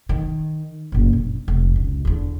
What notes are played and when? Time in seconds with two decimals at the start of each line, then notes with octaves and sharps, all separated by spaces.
0.09 D#3
0.92 F#1 A#2
1.13 A#1
1.48 F1
1.76 C#2
2.05 E2 D3